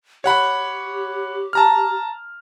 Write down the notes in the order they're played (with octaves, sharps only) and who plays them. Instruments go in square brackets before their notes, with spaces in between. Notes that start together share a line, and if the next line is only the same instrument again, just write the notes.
[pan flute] G4 [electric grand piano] C#5 F#5 B5
[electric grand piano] A5 A#5 F6